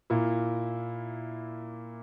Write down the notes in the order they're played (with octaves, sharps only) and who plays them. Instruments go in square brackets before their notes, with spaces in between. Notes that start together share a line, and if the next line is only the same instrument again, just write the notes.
[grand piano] A#2 A#3 E4